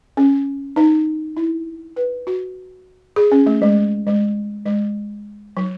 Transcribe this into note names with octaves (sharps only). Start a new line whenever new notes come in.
C#4
D#4
E4
B4
F#4
G#4
C#4
A3
G#3
G#3
G#3
F#3